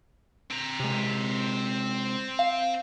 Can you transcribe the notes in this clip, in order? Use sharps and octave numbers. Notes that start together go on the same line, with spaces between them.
C4 A#5
C3 G#3
F5